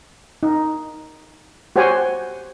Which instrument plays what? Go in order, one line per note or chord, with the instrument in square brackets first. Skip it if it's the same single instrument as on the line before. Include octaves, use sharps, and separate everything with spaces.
[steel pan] D#4
F#4 G4 C5 C#5 F#5 G#5